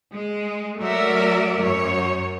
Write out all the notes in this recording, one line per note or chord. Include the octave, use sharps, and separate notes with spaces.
G#3
F#3 A3 A#4 D5 E5
F#2 C#5